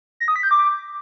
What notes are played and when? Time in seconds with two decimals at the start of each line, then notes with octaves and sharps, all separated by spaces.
0.20 A#6
0.28 D#6
0.36 B6
0.43 G6
0.51 D6